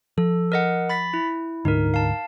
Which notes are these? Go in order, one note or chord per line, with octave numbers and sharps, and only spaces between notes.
F3 A4
A#4 D#5 F#5
B5 A6 B6
E4
D2 G#2 D3 D#4 A#4
F5 A5